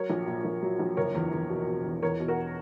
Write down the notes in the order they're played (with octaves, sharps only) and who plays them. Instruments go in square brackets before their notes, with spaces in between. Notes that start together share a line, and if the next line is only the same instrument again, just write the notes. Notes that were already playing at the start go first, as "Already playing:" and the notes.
Already playing: [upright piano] F#3 A#4 C#5
A#1
A#2
A#1
F#3
A#1
F#1 A#4 C#5
E2
E2
B2
B2
E2
E2 A#4 C#5
B2
F#4 A#4